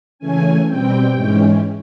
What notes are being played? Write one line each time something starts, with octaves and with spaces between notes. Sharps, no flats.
C#3 E3 A3 C#4 G#5
B2 G3 C4 G5
G#2 E3 G#3 C#4